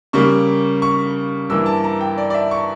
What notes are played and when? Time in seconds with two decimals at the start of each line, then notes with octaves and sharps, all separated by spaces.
0.13 C#3 G3 A#3 C#6
0.82 C#6
1.49 G2 E3 A#3 E6
1.66 A5
1.84 A#5
2.01 G5
2.18 D5
2.30 D5
2.34 E5
2.51 C#6